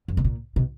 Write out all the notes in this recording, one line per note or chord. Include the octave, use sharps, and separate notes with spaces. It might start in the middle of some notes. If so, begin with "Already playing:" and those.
F#2
B2
A#2
B2